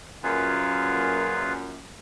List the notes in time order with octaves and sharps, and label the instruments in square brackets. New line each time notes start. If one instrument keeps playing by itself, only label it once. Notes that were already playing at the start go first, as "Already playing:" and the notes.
[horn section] F#2 A#2 [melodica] F4 G#4 B4